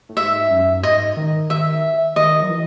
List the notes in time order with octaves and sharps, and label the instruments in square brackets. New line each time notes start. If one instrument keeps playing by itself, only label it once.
[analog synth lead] A2
[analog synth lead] G#2 [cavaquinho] E5
[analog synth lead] F#2
[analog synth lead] G#2 [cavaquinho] D#5
[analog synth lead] D#3
[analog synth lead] D#3 [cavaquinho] E5
[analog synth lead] D#3 [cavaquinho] D#5
[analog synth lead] F#3
E3